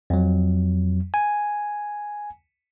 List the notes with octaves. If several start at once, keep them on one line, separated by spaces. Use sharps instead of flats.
F2 F#3
G#5